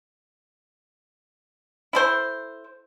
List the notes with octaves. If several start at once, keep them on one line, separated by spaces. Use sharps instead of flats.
E4 A4 C5